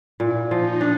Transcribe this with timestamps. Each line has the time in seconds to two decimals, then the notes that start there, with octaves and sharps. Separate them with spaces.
0.20 A#2 E4
0.51 F3 D#4
0.81 D4